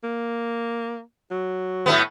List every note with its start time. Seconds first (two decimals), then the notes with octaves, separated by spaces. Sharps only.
0.04 A#3
1.31 F#3
1.86 A2 A3 B3